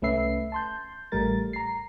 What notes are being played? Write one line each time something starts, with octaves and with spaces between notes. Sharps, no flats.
C2 A3 C#4 B4 E5 C7
A5 C6 G6
A1 G3 A3 A#4 A6
A#5 C7